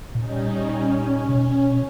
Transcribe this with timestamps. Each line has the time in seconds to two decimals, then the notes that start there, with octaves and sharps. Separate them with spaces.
0.15 A#2 G3 C#4 D#4
0.70 C#4
1.29 B2